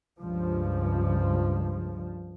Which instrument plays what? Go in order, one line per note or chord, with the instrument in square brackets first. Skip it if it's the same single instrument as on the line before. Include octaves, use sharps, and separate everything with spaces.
[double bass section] C#2 G2 F3